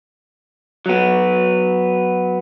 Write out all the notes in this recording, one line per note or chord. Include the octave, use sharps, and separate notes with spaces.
F#3 B3